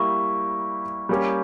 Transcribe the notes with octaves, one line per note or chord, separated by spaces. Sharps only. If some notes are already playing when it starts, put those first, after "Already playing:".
Already playing: G3 A#3 E4 G4 C#6
G3 A#3 C#4 G4